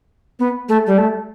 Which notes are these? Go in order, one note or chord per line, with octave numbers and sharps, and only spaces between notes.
B3
A3
G3
A3